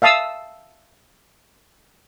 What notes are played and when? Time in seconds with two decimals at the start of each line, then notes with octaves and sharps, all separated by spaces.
0.02 E5 F5 A5 D#6 E6